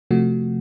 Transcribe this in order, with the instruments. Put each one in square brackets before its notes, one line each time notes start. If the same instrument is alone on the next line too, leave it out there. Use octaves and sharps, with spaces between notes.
[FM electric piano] C3 F3 A3 F#4